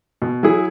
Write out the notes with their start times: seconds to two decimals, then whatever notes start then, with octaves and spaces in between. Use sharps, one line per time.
0.22 B2
0.43 F#3 E4 G#4